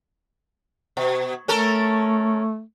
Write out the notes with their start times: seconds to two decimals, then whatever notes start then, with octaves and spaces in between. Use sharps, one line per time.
0.97 B2
1.48 A3 C#4 A4 A#4